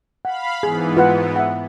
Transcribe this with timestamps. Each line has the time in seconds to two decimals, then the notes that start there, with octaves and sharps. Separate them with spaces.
0.25 F5 F#5 B5
0.63 G#2 E3 B3 G#4
0.97 F4 B4 F#5
1.36 E5 F#5